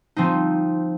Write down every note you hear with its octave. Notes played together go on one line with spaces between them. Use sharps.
F3 C4 D#4